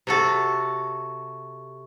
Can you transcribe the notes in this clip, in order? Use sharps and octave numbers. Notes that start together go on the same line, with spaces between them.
C3 F#4 A4